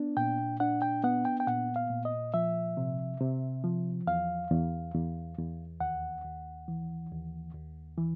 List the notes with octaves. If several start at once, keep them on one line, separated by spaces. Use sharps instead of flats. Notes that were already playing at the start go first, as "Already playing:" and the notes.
Already playing: B3 D4
A#2 G5
D4 F#5
G5
B3 F#5
G5
G5
A#2 F#5
F5
A#2
D#5
F3 E5
C3
C3
F3
E2 F5
E2
E2
E2
D#2 F#5
D#2
E3
D#2
D#2
E3